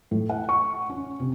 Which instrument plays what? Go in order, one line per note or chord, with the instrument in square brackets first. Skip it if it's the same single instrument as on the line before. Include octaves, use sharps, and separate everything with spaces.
[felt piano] A2
F#5
C#6
C#4
C3